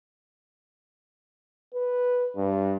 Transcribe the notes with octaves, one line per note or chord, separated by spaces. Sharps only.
B4
G2